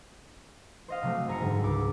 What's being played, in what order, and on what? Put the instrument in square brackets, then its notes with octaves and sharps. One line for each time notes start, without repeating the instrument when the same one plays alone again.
[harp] C5 D#5 F5
C3 F#3 A3
F#1 G#5 A#5 B6 C#7
G#2 D3 G3
C#2 D6 B6